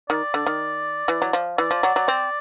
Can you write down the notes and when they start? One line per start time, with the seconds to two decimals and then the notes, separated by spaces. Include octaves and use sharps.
0.09 D#3 D5
0.34 D3
0.46 D#3
1.08 E3
1.22 F#3
1.33 F3
1.58 E3 D5
1.71 F3
1.83 F#3
1.96 F#3
2.08 C4